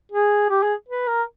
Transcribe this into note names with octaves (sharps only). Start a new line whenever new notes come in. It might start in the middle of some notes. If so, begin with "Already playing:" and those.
G#4
G4
G#4
B4
A#4